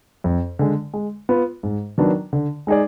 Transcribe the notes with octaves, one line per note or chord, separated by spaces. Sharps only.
F2
D3 G#3
G#3
B3 F4
G#2
D#3 F#3 B3 D4
D3
G#3 D#4 G#4 D5